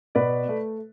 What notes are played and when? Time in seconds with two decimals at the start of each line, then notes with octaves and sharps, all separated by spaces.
0.15 B2 B4 D5
0.49 A3